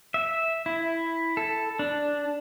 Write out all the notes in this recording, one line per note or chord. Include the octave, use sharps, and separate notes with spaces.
E5
E4
A4
D4